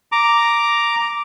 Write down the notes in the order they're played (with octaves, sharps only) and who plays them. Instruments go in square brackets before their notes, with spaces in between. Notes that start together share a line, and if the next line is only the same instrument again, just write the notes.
[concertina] A#5 D6